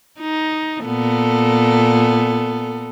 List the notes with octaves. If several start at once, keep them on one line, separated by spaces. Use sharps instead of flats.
D#4
A#2 B3 A4